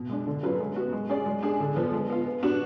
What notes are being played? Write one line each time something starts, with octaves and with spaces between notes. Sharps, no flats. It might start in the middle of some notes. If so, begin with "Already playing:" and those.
Already playing: B2
G#3 D4
D3
F#3 C#4 F4 B4
G#3
B3 F#4
G#3
C#4 G#4 D5
G#3
D4 G#4
D3
F3 B3
G#3
B3 F4
B3
D4 F#4